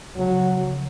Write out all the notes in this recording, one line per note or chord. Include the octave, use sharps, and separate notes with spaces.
C#2 C#3 F3 F#3